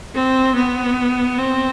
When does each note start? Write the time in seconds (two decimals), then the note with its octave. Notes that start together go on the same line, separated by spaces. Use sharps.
0.14 C4
0.55 B3
1.38 C4